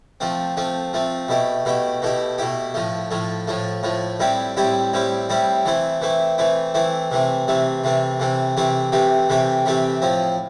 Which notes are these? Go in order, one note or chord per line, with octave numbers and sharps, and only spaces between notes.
F3 A3 C4
F3 A3 C4
F3 A3 C4
B2 A3 E4 G4
B2 A3 E4 G4
B2 A3 E4 G4
B2 A3 E4 G4
A2 F3 A3
A2 F3 A3
A2 F3 A3
A2 F3 A3
A2 G3 C4 E4 G4
A2 G3 C4 E4 G4
A2 G3 C4 E4 G4
A2 G3 C4 E4 G4
E3 A3 C4 E4
E3 A3 C4 E4
E3 A3 C4 E4
E3 A3 C4 E4
C3 E3 A3 C4
C3 E3 A3 C4
C3 E3 A3 C4
C3 E3 A3 C4
C3 E3 A3 C4 G4
C3 E3 A3 C4 G4
C3 E3 A3 C4 G4
C3 E3 A3 C4 G4
A2 F3 C4